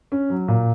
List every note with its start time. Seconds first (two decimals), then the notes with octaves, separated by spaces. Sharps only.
0.12 C#4
0.30 F#3
0.48 A#2